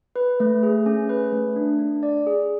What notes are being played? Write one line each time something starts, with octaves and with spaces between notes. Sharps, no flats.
B4
A3
G#4
C#4
B4
A3
D4
D4
D5
G#4